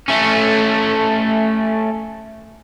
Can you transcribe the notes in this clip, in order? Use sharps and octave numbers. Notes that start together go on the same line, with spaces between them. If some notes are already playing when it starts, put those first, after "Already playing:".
A3 C#4